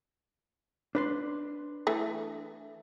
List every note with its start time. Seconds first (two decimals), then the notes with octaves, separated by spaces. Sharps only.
0.95 D4 B4 C6
1.87 E3 A3